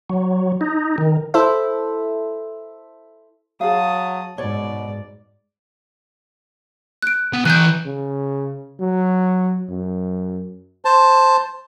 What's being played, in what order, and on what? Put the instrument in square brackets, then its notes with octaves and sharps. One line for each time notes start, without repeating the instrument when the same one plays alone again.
[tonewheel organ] F#3
D#4
D#3
[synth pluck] E4 A4 C5 E5
[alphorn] F#3 [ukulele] G#4 C#5 F5 [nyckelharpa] A5 D#6
[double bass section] G#2 [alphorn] B2 [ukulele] C#5 [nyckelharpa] D5
[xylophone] F#6 D7
[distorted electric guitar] B3
[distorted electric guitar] E3 A#5 [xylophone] F#6 G6
[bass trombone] C#3
F#3
F#2
[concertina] C5 A5